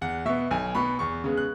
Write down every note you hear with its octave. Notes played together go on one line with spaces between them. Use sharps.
E2 F#5
B2 B3 E5
B1 G#5
B2 B3 B5
E2 C#6
C#3 G#3 B3
F#6